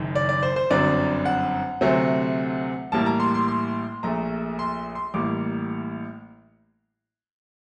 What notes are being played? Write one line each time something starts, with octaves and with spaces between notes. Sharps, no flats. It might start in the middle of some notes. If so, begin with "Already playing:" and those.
Already playing: F#1 F#2 D#3
D5
D5
C5
C5
G1 F#2 D3 F#3 C4 D5
F#5
D2 C3 F#3 A3 C4
A1 A2 G3 A#3 A5
A#5
C6
C6
C6
A#1 A#2 A3 A#5
C6
C6
A1 A2 G3 A#3 D6